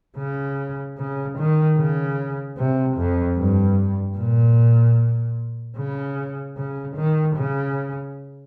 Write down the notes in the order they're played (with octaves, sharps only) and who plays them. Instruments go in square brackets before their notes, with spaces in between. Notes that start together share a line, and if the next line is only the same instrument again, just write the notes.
[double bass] C#3
C#3
D#3
C#3
C3
F2
G2
A#2
C#3
C#3
D#3
C#3